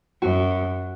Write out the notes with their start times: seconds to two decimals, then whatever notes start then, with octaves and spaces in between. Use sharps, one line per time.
0.22 F#2 F#4